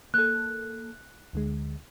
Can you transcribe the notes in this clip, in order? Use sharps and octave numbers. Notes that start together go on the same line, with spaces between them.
A#3 A4 F#6
D2 D3 G#3